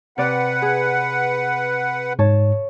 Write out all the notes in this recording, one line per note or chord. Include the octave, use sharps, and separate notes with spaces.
C3 B4 D5 F#5
G#4
G#2 C#5 A5